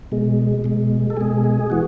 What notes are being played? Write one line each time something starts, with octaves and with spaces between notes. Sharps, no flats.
B2 G#3
B2 G#3
A4
B2 G#3 G#4
G#4
E3 F#4